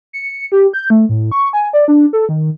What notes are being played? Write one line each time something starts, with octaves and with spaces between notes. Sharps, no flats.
C#7
G4
G6
A3
A2
C#6
G#5
D5
D4
A4
D#3